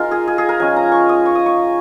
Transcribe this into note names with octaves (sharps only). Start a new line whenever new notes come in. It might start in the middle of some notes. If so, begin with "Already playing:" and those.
Already playing: G#3 D#4 F4 A#4
G#4
G#4
G#4
A#4
F3 G#3 C#4 G#5
A#5
C#6
D#6
C#6
D#6
C#6